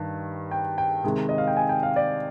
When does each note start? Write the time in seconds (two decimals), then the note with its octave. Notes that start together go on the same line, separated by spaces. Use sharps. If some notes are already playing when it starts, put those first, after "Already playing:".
Already playing: G2 D#3
0.51 G5
0.78 G5
1.04 C3 D#3 G#3
1.29 D#5
1.38 F5
1.47 G5
1.56 G#5
1.69 G5
1.83 F5
1.96 D5